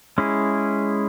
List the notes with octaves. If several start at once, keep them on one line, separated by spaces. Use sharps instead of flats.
G#3 C#4 E4 G#4